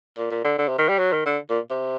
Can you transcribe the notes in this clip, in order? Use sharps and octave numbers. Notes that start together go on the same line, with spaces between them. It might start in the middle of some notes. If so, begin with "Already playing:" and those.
A#2
A#2
D3
D3
C3
D#3
G3
F#3
D#3
D3
A#2
C3